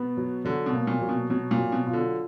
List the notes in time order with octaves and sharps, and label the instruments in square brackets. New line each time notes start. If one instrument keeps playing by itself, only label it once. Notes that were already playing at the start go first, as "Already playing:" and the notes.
Already playing: [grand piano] B2 [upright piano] B3
[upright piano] F#3
[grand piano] D3 [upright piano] F#3
[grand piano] B2
[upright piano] A#3
[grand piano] A#2
[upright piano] F#3
[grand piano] B2
[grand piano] B2 [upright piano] F#3
[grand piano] A#2
[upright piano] F#3
[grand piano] B2
[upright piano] F4
[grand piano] D3